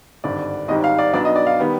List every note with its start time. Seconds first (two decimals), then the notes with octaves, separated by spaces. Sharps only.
0.24 G#1 G2 D3 D5
0.68 G#1 G#2 G3 D#5
0.84 F5
0.99 D5
1.14 B1 B2 B3 D4 D5
1.25 D#5
1.36 D5
1.47 F5
1.59 D#3 G3 B3